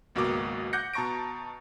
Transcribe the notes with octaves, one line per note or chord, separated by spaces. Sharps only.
G#1 C#2 B2 A#3 F#4 D6
F#5 D6 F#6 G6 A#6 C#7
B2 A5 A#5 C#6 A#6 D7